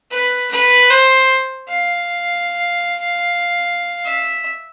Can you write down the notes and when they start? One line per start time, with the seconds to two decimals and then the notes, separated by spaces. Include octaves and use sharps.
0.11 B4
0.51 B4
0.90 C5
1.69 F5
4.05 E5